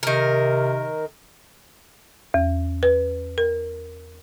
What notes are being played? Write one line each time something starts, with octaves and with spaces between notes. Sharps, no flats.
C3 D#3 A#4
E2
B4
A#4